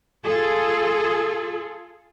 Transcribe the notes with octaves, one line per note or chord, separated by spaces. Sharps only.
F4 G#4 A4